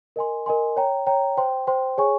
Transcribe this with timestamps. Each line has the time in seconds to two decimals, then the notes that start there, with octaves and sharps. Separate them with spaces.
0.16 A#4 D#5 G#5 C6
0.46 A#4 D#5 G#5 C6
0.77 C#5 G5 A#5
1.06 C#5 G5 A#5
1.37 C5 G5 C6
1.67 C5 G5 C6
1.98 G#4 C#5 G#5 C#6